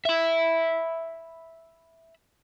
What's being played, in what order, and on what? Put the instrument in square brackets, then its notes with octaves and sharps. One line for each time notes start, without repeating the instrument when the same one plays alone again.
[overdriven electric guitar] E5 B5